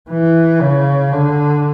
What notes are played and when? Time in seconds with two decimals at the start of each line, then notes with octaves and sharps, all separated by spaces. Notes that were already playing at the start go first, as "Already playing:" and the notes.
0.10 E3
0.62 C#3
1.13 D3